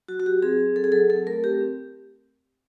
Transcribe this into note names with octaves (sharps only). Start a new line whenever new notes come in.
F#3 F#4
F#4
F#3 G4
C4 G#4
C4
F#3 A4
G#4
F#3 A4
C4 A4
A3 A#4
C4 G4
C4